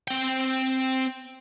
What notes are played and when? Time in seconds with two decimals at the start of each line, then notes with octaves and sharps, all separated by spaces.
0.08 C4 G5